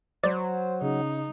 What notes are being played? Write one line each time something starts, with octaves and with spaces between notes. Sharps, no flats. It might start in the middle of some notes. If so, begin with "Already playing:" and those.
F#3 C5 D5
C#3 D#4